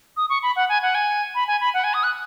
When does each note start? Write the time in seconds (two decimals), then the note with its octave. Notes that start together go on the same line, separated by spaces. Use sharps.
0.17 D#6
0.30 C#6
0.43 B5
0.56 F#5
0.69 G#5
0.82 F#5
0.95 G#5
1.35 B5
1.48 G#5
1.61 B5
1.74 F#5
1.84 G#5
1.94 D#6
2.03 F#6